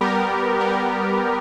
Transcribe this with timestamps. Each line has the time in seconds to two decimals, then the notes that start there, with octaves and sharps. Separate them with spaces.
0.01 G3 B3 G4 A#4
0.60 G3 B3 G4 A#4